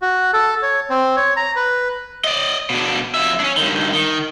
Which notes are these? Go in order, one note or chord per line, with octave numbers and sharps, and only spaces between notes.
F#4
A4
C#5
C4
C#5
A#5
B4
D5 D#5
B2 D4
F2 E5
C#4 D4
G2 D#3
D#3